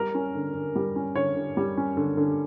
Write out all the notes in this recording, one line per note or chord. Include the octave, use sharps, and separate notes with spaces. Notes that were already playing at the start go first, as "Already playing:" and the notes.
Already playing: G3 A#4
C#4
D3
D3
G3
C#4
D3 C#5
D3
G3
C#4
D3
D3